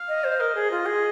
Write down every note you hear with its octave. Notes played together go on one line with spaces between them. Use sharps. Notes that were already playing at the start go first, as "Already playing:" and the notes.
Already playing: F5
D#5
C5
A#4 D#5
G#4
F4
G#4